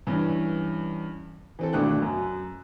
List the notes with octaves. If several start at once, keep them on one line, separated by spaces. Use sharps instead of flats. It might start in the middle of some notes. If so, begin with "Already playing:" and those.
G2 E3 C#4
E3 C4 A4
G#1 B2 A3 D4 G5 F#6
F#2